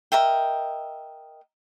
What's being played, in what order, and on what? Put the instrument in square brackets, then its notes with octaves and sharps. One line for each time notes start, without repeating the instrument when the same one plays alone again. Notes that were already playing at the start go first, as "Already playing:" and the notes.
[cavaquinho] A#4 D#5 E5 G5